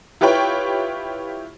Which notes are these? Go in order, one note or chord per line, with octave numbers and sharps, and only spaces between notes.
E4 F4 G4 B4 C#5 G5